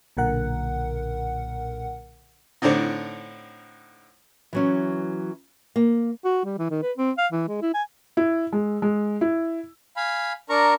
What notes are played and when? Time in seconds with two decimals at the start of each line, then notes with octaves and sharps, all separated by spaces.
0.17 B1 A#2 D3 A#4 F#5
2.62 A2 D3 C4 D4 D#4
4.53 E3 F#3 C#4
5.76 A#3
6.25 F#4
6.45 G3
6.58 E3
6.70 D#3
6.82 B4
6.97 C4
7.18 F5
7.32 E3
7.48 G#3
7.62 E4
7.74 G#5
8.17 E4
8.53 G#3
8.82 G#3
9.21 E4
9.96 F5 G#5 B5
10.49 D4 A#4 A#5 C#6